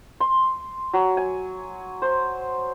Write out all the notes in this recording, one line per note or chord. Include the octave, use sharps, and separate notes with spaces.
C6
F#3
G#5
C5